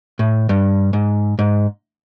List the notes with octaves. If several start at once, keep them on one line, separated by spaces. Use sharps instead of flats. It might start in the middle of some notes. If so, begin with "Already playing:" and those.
A2
G2
G#2
G#2